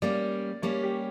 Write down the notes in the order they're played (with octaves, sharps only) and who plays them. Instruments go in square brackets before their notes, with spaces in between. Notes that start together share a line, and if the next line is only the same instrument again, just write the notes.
[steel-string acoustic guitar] G3 A#3 C#4 [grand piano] D5
[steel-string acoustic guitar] G3 A#3 C#4 [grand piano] C#5
[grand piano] G4